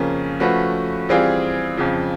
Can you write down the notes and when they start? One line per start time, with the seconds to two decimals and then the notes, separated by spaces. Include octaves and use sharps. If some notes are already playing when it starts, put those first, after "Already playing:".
Already playing: F2 C#3 F3 A#3 C#4
0.40 F3 A3 C#4 F#4 B4
1.09 E3 G3 C4 F4 G#4
1.77 F2 C#3 F3